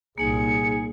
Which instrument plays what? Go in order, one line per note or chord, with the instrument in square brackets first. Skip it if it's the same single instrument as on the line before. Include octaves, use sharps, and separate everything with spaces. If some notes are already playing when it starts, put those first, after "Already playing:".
[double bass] C2 A#2 [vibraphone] A#3 D#4 [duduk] G#4 [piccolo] C#7